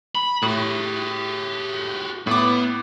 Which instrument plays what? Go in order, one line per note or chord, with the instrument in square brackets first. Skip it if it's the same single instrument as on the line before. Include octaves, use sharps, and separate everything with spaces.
[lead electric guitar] B5
[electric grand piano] A2 [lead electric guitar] F#4 G4
[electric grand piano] A2 D6 [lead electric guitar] B3